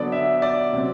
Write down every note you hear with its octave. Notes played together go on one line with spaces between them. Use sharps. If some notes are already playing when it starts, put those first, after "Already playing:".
Already playing: D3 F#3 B3 D5
E5
D5
C3 F#3 C4